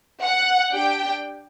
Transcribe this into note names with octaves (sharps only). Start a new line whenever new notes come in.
F#5
D4 G4 G5